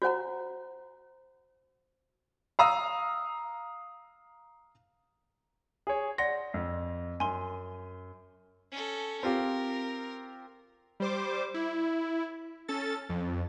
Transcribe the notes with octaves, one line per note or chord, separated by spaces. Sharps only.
F#4 C5 F#5 A#5
F5 A#5 D#6 E6
G#4 C#5
D5 F#5 C6 A#6
F2
F#2 G#5 C6
C#4 A4
C4 F4 G4 A#4
G3 C5 D6
E4
C#4 A4 A6
F2